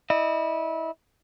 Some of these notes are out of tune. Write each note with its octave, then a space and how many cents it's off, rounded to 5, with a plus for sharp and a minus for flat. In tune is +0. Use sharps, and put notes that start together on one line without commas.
E4 -25 D#5 -35